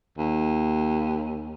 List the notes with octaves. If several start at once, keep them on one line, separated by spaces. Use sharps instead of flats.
D#2